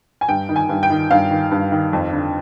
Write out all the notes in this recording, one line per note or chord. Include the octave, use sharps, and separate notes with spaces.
G#5
G2 G5
D#3
G#5
G2
G5
D#3
G2 F5
D#3
G2
D#3
F2
D3